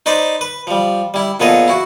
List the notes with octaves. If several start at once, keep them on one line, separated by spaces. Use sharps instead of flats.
D#4 B4 C5 D5
B4
F3 G3
G3 E4
A#2 F3 B3 G#4 A4 D#5
E4 F#4